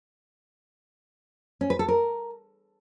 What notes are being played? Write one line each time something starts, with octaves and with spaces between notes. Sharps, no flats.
C#4
B4
A4
A#4